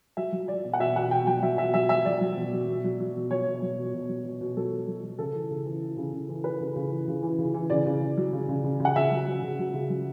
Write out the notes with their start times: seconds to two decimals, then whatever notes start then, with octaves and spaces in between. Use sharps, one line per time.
0.17 F#3 E5
0.32 F#3
0.48 F#3 D5
0.65 B2
0.73 F#5
0.80 B2 E5
0.96 B2 F#5
1.11 B2 G5
1.27 F#3 G5
1.42 F#3 E5
1.58 B2 E5
1.74 F#3 E5
1.89 F#3 E5
2.05 F#3 D5
2.21 F#3
2.37 B2
2.53 F#3
2.68 B2
2.84 F#3
3.00 F#3
3.16 B2
3.31 F#3 C#5
3.47 B2
3.62 F#3
3.78 B2
3.94 B2
4.09 F#3
4.25 B2
4.41 B2
4.57 F#3 A4
4.72 F#3
4.88 F#3
5.03 F#3
5.18 C#3 A4
5.35 E3
5.50 C#3
5.66 E3
5.82 E3
5.97 C#3
6.13 C#3
6.28 E3
6.44 E3 B4
6.61 C#3
6.76 C#3
6.91 E3
7.08 C#3
7.23 E3
7.38 C#3
7.54 E3
7.70 C#3 D5
7.86 C#3
8.01 C#3
8.17 F#3
8.33 C#3
8.49 C#3
8.64 C#3
8.80 C#3
8.85 F#5
8.95 C#3 E5
9.11 F#3
9.27 F#3
9.42 C#3
9.59 F#3
9.74 C#3
9.90 F#3